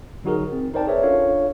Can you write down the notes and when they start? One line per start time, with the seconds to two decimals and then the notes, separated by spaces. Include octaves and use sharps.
0.24 D3 F#3 D#4 F#4 G#4 A#4
0.52 C4
0.74 D#4 A#4 C5 D5 G5 A5
0.87 G#4 A#4 B4 C#5 D5 E5
1.02 C#4 D4 F4 A4 C#5 F5